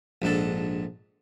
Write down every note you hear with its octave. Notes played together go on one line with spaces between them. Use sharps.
A#1 G#2 D4 A4